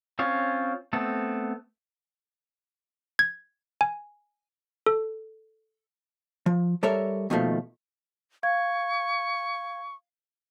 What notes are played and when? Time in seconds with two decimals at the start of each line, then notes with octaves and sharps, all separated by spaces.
0.19 C4 C#4 F4 C#5
0.93 A3 B3 C4 A4
3.19 G#6
3.81 G#5
4.86 A4
6.46 F3
6.83 G3 A4 A#4 C#5 E5
7.30 D#2 B2 D#3 F3 A3
8.43 F5 C#6 G#6